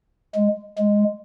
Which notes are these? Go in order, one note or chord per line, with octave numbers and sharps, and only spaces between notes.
G#3
G#3